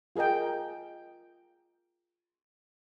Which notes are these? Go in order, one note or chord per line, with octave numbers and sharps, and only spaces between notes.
F4 G#4 A#4 D#5 G5